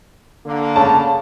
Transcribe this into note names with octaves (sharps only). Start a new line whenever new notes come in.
D3 A#3
C#3 A5